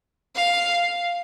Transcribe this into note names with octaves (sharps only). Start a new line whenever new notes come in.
F5